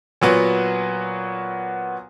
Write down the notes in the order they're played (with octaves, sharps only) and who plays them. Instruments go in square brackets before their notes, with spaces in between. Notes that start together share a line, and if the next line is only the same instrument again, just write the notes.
[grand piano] A#2 F#3 B3 F#4